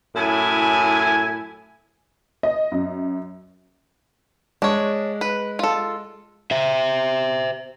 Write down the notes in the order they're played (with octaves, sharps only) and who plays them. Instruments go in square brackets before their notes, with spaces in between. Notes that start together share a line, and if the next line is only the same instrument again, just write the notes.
[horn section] F#2 A2 E4 G#5
[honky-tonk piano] D#5
F#2
[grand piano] G#3 [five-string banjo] D4 C#5
[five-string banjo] B4
F4 A4
[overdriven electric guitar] C5 E5